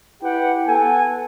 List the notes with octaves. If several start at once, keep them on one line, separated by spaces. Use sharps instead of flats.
E4 G4 B4 F#5 G5
B3 A4 F#5 G#5